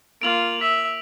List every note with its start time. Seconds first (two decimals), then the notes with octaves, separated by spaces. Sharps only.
0.22 A#3 F4 D7 F7 F#7
0.61 E5 B6